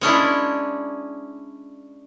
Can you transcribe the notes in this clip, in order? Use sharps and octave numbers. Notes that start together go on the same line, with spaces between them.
G#3 C#4 D4 E4